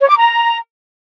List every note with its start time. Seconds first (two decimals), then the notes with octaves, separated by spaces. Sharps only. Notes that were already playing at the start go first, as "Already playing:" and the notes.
0.01 C#5
0.09 D6
0.18 A#5